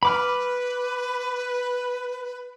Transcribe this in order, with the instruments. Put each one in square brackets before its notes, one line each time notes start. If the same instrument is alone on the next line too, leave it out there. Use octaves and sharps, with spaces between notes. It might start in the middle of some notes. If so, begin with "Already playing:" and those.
[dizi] B4 [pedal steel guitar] B5 D6 F6